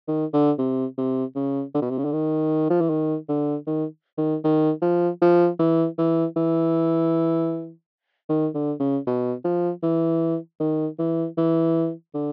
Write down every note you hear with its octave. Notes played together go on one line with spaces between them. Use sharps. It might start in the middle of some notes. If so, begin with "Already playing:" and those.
D#3
D3
C3
C3
C#3
D3
B2
C3
C#3
D3
D#3
F3
E3
D#3
D3
D#3
D#3
D#3
F3
F3
E3
E3
E3
D#3
D3
C#3
B2
F3
E3
D#3
E3
E3
D3